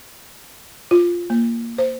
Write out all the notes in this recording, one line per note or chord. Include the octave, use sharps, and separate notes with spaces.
F4
A#3
C5